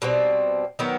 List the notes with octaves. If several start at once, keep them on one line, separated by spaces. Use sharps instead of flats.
B2 G3 C4
D#3 F#3 B3